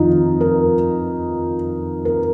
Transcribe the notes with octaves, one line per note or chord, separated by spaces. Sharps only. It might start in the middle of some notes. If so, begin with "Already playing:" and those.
Already playing: F2 D#3 D#4 F4
A#4
A#4